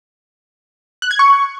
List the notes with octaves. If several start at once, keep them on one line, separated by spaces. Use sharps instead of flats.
F#6
G#6
C#6